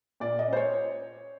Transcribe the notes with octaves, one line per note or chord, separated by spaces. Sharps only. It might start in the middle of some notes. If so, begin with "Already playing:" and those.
A#2 D5
D#5
C#4 C5
C#5